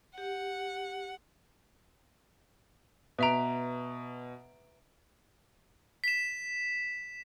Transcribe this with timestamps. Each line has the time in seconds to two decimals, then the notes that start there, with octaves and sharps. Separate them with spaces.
0.18 G4 F#5
3.19 B2 B4 E5 A#5 D7
6.04 B6 E7